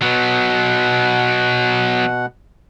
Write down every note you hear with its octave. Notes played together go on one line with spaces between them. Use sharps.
B2 F#3 B3 F#5